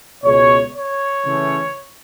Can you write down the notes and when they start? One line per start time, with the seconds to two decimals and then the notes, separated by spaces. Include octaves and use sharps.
0.24 C#2 B2 G#3 C#4 C#5
0.75 C#5
1.25 C#3 E3 A3 C#4